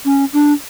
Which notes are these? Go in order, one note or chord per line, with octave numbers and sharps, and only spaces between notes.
C#4
D4